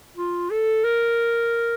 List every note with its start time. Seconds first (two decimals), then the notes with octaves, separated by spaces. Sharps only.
0.17 F4
0.50 A4
0.84 A#4